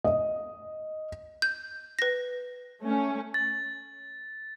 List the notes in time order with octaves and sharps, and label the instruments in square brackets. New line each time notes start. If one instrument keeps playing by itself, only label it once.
[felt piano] D#5
[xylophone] G6
B4 A#6
[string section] A3 C#4
[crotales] A6